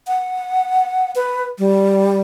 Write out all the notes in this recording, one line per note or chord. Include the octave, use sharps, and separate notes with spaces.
F#5
B4
G3